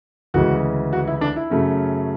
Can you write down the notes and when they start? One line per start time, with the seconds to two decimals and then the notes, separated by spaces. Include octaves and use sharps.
0.34 D2 C#3 E3 G#3 F#4
0.93 F#4
1.07 E4
1.21 D4
1.36 E4
1.50 F#2 C#3 F#3 A3 C#4